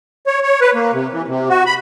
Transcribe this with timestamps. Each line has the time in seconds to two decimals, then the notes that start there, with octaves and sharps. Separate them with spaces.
0.27 C#5
0.43 C#5
0.61 B4
0.74 A#3
0.93 C3
1.12 E3
1.28 C3
1.49 F#4
1.66 B5